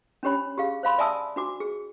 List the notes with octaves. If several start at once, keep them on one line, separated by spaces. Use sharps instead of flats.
C#4 D4 G4 C#5 B5
G4 G#4 F5
C5 F5 B5 C6
D5 E5 G#5 A5 D#6 E6
D4 F#4 D6
G#4